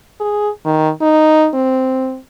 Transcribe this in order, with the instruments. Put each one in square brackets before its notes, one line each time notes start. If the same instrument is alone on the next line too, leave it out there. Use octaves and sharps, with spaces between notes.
[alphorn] G#4
D#3
D#4
C4